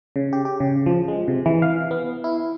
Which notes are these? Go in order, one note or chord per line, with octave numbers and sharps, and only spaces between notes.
C#3
G4
G4
C#3
F3
G#3
C3
E3
F5
B3
E4